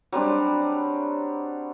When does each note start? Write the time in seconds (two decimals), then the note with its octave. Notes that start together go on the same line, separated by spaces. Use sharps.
0.12 F#3 G3 C4 D4